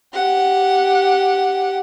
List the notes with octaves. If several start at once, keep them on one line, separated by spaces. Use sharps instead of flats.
G4 F#5